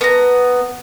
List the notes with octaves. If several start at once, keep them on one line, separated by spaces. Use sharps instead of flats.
B3 A#5